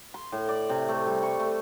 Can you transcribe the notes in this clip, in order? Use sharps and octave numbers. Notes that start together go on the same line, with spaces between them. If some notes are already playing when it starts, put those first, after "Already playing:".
C6
A2
D5
C3
A3
G3
C#6
A3